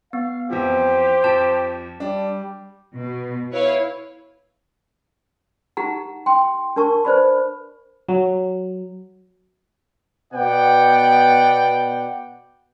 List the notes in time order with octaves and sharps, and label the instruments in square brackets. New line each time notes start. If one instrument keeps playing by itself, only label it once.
[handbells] B3 [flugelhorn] F5
[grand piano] F2 E3 F3 [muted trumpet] G4 [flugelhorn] C5
[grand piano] F2 [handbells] A5
[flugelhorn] G3 [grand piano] D4
[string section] B2
E4 B4 C#5 F5
[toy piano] D#4 G4 F#5 A#5
G5 C6
D4 A#4 A5 C#6
B4 C5 D5 B5
[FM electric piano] F#3
[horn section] B2 B3 D5 F#5 G5